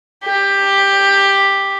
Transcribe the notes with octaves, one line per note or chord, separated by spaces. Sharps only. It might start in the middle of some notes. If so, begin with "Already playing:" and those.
G4